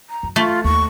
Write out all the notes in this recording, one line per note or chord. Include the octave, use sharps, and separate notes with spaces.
A#5
F#2
A3 F4
D#2 C#6